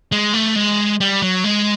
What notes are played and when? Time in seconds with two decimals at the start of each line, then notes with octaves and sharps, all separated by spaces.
0.12 G#3
0.34 A3
0.56 G#3
1.01 G3
1.22 F#3
1.44 G#3